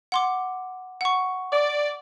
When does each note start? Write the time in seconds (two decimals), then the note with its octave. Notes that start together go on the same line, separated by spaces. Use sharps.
0.12 F#5 C6 D6
1.01 F#5 C#6
1.53 D5